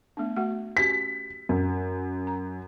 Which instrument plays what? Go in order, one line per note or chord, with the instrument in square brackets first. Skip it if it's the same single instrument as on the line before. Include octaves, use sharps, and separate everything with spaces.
[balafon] A3 B3 D4
A3 F#4 F#5
[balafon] C#4 F#4 G4 [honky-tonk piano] B6
[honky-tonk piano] F#2
[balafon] A#5